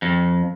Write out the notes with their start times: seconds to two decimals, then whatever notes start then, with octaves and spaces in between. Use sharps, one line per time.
0.02 F2